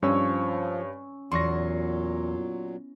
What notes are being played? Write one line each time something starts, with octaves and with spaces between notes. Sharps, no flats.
G2 F3 C#4 C#5 E6
E2 A#2 F#3 C6 C#6 A#6